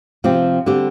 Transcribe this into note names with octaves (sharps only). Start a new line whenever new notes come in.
C3 F3 C4 G4
D3 G3 C4 G4